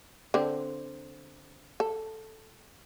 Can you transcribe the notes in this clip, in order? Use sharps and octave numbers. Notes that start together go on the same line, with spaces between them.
D3 C4
A4